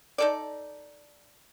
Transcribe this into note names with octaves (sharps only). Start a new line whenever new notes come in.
D#4 A4 D5